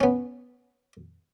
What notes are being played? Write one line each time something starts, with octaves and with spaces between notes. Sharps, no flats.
B3 C#4